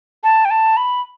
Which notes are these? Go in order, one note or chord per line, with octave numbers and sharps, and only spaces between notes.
A5
G5
A5
B5